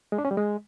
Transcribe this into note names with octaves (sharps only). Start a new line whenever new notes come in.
G#3
D4
C#4
G3
G#3